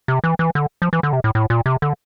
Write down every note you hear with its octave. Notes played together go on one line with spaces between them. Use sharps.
C3
E3
E3
D3
F3
E3
D3
C3
A2
A2
A#2
C3
D3